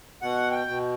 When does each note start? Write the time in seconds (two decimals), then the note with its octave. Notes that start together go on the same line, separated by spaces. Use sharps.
0.22 B2 F#5
0.51 G5
0.67 B2